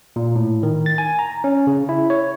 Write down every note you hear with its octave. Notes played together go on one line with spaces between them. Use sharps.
A#2
A2
D#3
A6
G#5
A#5
C#4
C#3
E4
C#5